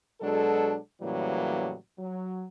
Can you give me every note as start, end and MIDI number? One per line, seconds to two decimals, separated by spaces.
0.21 0.77 47
0.21 0.77 54
0.21 0.77 56
0.21 0.77 62
0.21 0.77 69
1.02 1.74 45
1.02 1.74 49
1.02 1.74 52
1.02 1.74 54
1.02 1.74 55
1.02 1.74 58
1.99 2.46 54